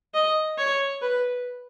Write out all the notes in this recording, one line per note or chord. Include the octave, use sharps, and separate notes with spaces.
D#5
C#5
B4